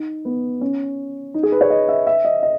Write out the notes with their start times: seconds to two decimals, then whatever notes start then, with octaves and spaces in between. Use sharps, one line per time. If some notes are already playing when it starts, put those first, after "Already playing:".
Already playing: D#4
0.25 B3
0.61 C#4
1.34 D#4
1.43 G#4
1.52 B4
1.61 C#5
1.70 D#5
1.89 E5
2.07 E5
2.25 D#5
2.43 D#5